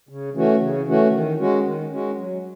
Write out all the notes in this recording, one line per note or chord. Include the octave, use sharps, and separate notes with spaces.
C#3
E3 A3 C#4 F#4
C#3
E3 A3 C#4 F#4
D#3
G#3 C#4 F#4
D#3
G#3 C#4 F#4
F#3